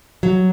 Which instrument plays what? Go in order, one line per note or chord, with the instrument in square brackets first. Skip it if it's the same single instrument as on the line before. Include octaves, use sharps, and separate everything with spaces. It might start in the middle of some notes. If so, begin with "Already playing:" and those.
[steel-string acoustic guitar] F#3